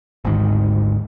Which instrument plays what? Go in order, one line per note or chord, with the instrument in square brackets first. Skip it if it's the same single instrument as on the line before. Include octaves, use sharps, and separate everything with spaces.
[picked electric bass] G#1 D2 G#2 D#3